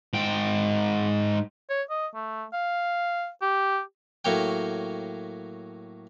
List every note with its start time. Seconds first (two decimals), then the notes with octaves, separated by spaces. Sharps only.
0.13 G#2 G5
1.70 C#5
1.90 D#5
2.15 A3
2.53 F5
3.42 G4
4.25 A2 F#3 A#3 C#5 G5